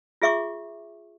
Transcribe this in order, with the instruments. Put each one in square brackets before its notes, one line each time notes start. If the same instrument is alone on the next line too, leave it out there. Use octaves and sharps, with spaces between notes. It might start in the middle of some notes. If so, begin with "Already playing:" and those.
[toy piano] F4 G#4 E5 C#6 D6